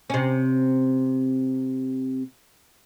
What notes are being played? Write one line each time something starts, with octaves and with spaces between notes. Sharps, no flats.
C3 C#4